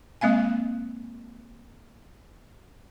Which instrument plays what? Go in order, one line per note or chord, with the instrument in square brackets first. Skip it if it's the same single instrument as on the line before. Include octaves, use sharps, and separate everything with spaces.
[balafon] G#3 A#3 C4 F5 G#5